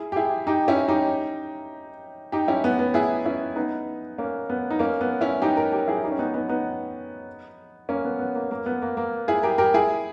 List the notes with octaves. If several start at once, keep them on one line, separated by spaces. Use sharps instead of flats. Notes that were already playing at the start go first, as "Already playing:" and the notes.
Already playing: E4 G#4
G4
E4 G#4
D#4 G4
C#4 E4
D#4 G4
D#4 G4
C#4 E4
B3
B3
E4 G#4
C#4 E4
B3 D#4
A#3 C#4
B3
D#4
A#3 C#4
B3
C#4 E4
D#4 G4
G4 A#4
G4 A#4
E4 G#4
D#4 G4
C#4
B3 D#4
B3 D#4
B3 D#4
A#3 C#4
B3
B3
A#3
A#3
B3
A#3
A#3
E4 G#4
G4 A#4
G4 A#4
E4 G#4